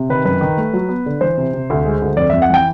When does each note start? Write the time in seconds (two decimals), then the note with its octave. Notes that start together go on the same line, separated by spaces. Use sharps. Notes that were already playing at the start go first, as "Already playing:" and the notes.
Already playing: C3
0.09 D#3 B4
0.25 F#2 B4
0.41 D#3
0.58 A3
0.73 F#3
0.89 B3
1.06 D3
1.21 E3 C5
1.37 C3
1.54 C3
1.70 D2
1.86 G#3
2.02 D2
2.17 F2 D5
2.30 F2 E5
2.42 F#5
2.50 E3 G5